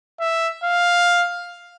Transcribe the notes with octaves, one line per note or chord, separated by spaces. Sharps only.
E5
F5